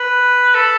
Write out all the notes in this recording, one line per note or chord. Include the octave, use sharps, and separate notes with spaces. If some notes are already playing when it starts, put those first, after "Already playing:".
Already playing: B4
A4